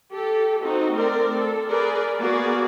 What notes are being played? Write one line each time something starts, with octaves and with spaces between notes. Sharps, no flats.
G4 A4
C4 D#4 F#4
A3 C4 A#4 D5
A4
G#4 A#4 B4 D5
A#3 B3 F#4 G#4 D5